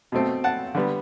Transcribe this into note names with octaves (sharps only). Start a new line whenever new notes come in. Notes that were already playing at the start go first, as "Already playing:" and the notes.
B2 A3 C4
F#5 A5
D3 G3 B3